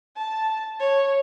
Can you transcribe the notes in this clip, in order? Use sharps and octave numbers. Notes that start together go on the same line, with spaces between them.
A5
C#5